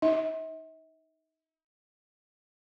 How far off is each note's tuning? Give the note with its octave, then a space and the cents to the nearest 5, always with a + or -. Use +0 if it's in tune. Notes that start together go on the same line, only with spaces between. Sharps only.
D#4 +0 E5 -45